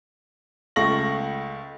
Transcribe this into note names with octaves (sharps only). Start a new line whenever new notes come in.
C#2 A3 F4 C#6 A#6 F#7